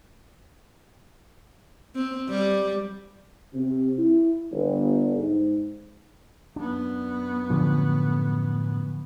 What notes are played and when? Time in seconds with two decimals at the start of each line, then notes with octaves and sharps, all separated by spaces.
1.95 C4
2.29 G3
3.54 C3
3.99 E4
4.52 G1
5.16 G#2
6.56 F#2 B3 D4
7.50 A2 D3 F3